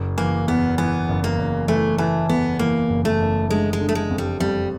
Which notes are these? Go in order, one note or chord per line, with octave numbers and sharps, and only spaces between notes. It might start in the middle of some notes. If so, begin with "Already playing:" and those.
Already playing: F#1
E3 A#3
E2 B3
E3 B3
F#1
A#3
F#1
E3 A3
E3 A3
E2 B3
E3 A#3
F#1
A3
F#1
D3 G#3
G#3
D3
A3
G#3
F2
G3
F2 G3